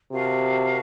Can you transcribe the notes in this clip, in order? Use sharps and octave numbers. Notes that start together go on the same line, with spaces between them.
C3 F#4 A#4 F5 A5